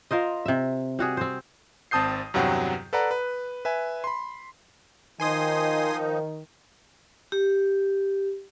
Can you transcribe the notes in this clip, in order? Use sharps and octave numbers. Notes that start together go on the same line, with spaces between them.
F4 A#4 C5 D#5
C3 E5
G3 F#4 G#4
C4 C5
G#1 C4 A5 D#6 G6 C7
E2 G2 C3 F#3 F#5 G5
A4 B4 D5 F#5 A#5
B4
B4 E5 G#5
B5 C6
D#3 F3 D#4 G#5 C6 D#6
G4